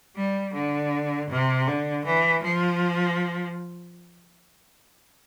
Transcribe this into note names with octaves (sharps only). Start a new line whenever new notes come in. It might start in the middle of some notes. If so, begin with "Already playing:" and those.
G3
D3
C3
D3
E3
F3